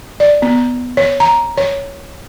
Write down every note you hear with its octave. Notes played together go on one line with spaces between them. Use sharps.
D5
B3
C#5
A#5
C#5